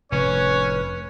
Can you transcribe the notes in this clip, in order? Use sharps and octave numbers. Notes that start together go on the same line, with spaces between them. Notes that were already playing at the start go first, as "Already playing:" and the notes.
F1 A2 C#4 B4 C#5